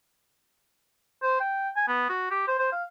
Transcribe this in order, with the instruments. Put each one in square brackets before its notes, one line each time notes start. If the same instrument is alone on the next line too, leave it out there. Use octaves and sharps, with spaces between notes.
[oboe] C5
G5
G#5
B3
F#4
G4
C5
C5
F5